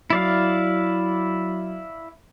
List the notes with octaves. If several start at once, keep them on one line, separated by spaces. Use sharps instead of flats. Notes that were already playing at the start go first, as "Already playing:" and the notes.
F#3 E4 D5 F5